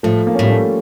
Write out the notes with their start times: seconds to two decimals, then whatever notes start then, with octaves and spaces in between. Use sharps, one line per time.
0.03 A2 F3 A3
0.27 A#3
0.35 C#4
0.39 A2 G3 A#3
0.50 A3 C#4